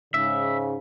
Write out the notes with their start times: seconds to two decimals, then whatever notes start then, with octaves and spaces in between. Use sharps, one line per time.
0.14 G#2 C#3 E5